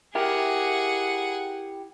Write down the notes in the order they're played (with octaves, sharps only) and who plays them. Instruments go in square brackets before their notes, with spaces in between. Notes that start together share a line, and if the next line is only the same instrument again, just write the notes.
[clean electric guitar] E4 G4 A#4 [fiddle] G#4 F#5